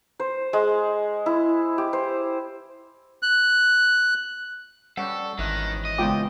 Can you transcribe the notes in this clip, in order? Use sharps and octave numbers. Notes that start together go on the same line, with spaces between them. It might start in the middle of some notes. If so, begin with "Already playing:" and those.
C5
G#3
E4
G4
C5
F#6
G3 C#4 A4 F#5
G#1 D#3 E3 F#6
D#5
G#2 C#3 B3 F4 G5 D6